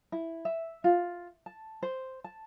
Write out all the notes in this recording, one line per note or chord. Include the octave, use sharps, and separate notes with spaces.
E4
E5
F4
A5
C5
A5